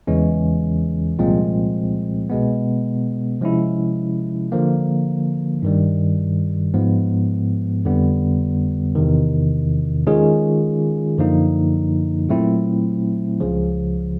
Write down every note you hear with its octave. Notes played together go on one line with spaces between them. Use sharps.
E2 C#3 E3 G#3 C#4
C2 A#2 F3 G#3 C4
B2 G#3 B3
C3 F3 G#3 C#4 E4
D3 F3 A#3
G2 D#3 G3
G#2 F3 G#3 B3
F2 D3 G3 B3
E2 C3 D#3
D#3 G#3 C#4 F4 G#4
F#2 D3 F3 A#3 D#4
A#2 F#3 A3 C4 E4
C#2 C#3 F3